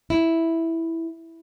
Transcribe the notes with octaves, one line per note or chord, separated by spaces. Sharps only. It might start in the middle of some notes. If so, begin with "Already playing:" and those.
E4